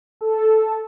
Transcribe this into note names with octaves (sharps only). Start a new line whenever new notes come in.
A4